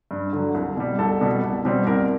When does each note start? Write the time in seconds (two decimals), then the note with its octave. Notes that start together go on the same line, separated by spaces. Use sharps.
0.11 G2
0.33 D3 F#3
0.54 C2
0.77 B2 G3
0.99 C2 A4
1.21 B2 G3
1.43 C2
1.65 B2 G3 C4
1.87 C2 A#4